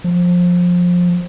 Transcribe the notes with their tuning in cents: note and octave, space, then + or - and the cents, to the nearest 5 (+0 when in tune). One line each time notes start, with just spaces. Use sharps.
F3 +20